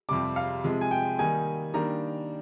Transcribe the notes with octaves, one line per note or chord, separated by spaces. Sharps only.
F2 C3 G3 D6
F5
C3 F3 G#3
G#5
G5
D#3 G3 A#3 D#4 G#5
D#3 G3 A#3 D4 A#5